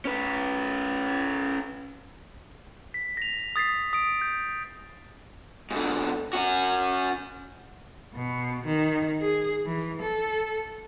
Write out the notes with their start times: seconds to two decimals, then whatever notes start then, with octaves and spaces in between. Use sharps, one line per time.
0.05 C#4 B4
2.94 B6
3.17 A#6 F7
3.56 D#6 A6 B6 C7
3.93 D#6 D7
4.21 D#6 G6
5.71 G#2 D3
6.33 C#4 F#4
8.14 B2
8.65 D#3
9.22 G#4
9.66 E3
10.01 A4